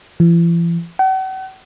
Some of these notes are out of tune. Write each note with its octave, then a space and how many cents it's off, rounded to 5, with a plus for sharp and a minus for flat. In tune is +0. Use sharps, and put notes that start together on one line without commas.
E3 +45
F#5 +45